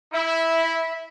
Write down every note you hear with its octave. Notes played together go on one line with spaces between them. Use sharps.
E4 E5